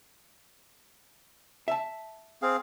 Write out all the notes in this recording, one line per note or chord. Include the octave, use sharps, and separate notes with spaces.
E5 A5
C4 G#4 F5